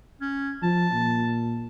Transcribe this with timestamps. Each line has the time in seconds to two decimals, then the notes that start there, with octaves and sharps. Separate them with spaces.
0.21 C#4
0.63 F3 A5
0.93 A#2